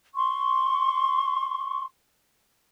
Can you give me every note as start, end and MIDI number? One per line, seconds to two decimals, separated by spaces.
0.14 1.84 84
0.14 1.84 85